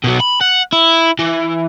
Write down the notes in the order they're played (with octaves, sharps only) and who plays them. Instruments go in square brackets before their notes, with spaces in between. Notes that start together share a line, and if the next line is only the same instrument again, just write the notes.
[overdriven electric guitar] B2 F#3
B5
F#5
E4
E3